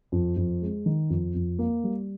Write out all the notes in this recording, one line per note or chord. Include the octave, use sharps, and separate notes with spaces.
F2
F2
G#3
D#3
F2
F2
A#3
G3